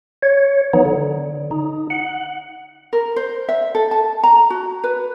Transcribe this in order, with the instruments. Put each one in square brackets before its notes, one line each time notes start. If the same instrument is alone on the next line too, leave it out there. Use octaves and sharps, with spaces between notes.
[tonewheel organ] C#5
E3 F#3 B3 D#4
D3
D#4
F#5
[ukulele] A#4
C5
E5
A4
A5
A#5
F#4
B4